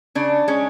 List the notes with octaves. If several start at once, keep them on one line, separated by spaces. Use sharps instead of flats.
C#3 D4
G#3 C#4